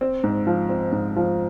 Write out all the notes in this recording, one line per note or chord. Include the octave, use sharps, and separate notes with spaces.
C4
G#2
F3
C4
G#2
F3